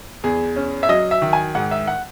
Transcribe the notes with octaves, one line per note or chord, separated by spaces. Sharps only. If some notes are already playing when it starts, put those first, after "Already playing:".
E2 G#4
C#4
E5
F#3 D#5
E5
D#3
G#5
G#2 F#5
E5
F#5